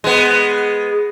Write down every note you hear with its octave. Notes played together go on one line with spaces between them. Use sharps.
G#3 B3